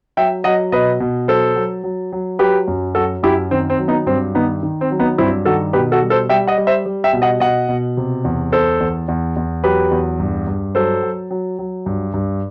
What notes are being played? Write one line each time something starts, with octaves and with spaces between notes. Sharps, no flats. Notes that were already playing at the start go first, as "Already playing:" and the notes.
F#3 E5 G5
F#3 D#5 F#5
B2 B4 D#5
B2
F#3 A4 C5
F#3
F#3
F#3
F#3 G4 B4
F#2
F#3 F#4 A4
F#2 E4 G4
D#3 C4
C4
F#3
B3 D#4
G2 C4
D#3 B3 D#4
D#3
C4
F#3
B3 D#4
G2 C4 E4
D#3 F#4 A4
B2 G4 B4
F#4 A4
G3
A4 C5
G3 E5 G5
D#5 F#5
G3
C5 E5
G3
E5 G5
B2
D#5 F#5
B2 D#5 F#5
B2
C3
E2
E2 A4 C5
E2
E2
E2
F#3 G4 B4
E2
G2
G2
F#3 A4 C5
F#3
F#3
F#3
G2
G2